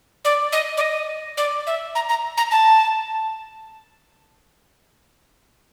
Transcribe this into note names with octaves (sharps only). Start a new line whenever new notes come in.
D5
D#5
D5
D#5
D5
E5
A#5
A#5
A#5
A5